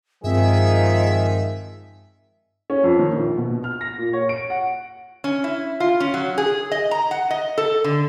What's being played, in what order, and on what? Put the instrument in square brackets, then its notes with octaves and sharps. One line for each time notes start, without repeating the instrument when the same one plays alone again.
[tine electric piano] G2 C4 [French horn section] D#3 F3 G#3 [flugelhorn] G#4 [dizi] E5
[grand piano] C#4
F2
D#3
A#1
B2
F6
A#6
A#2
C#5
D7
F#5
[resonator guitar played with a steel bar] C#4
E4
F4
C#4
F#3
G#4
D#5
A#5
F#5
D#5
A4
D3